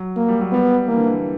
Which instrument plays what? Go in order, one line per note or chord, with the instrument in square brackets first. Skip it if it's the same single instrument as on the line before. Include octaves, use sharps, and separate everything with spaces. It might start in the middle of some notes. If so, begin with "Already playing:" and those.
Already playing: [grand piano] F#3
[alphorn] A#3
[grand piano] G3
F#3
[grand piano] G3 [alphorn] B3
[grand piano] E3 [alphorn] A#3
[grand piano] D3
E3